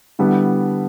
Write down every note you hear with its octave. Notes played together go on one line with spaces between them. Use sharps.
D3 G3 B3 E4